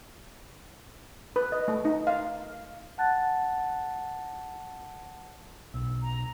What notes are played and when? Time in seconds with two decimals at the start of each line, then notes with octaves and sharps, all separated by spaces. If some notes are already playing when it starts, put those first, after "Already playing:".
1.36 B4
1.52 D#5
1.68 A3
1.85 D#4
2.07 F5
2.98 F#5 A5 F#6 A6
5.74 B1 E6
6.02 A#5